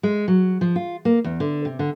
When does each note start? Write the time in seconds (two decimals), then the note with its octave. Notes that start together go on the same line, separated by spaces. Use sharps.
0.03 G#3
0.28 F#3
0.61 F3
0.76 F4
1.05 A#3
1.24 E2
1.40 D3
1.65 C3
1.79 D3